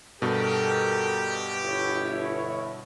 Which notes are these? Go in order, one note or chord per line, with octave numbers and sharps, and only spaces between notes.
G2 B2 G4 A4 A#4
G1 E4 C#5